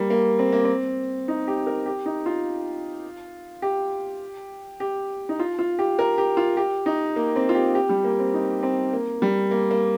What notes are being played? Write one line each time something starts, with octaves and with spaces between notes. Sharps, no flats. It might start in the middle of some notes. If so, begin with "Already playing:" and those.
Already playing: G3 A#3
A#3
C4
A#3
C4
D#4
G4
A#4
G4
D#4
F4
G4
G4
D#4
F4
F4
G4
A#4
G4
F4
G4
D#4
A#3
C4
F4
G4
G4
G3
A#3
C4
D#4
C4
A#3
G3
A#3
A#3